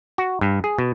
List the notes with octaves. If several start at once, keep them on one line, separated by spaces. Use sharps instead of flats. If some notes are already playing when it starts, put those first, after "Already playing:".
F#4
G2
G#4
B2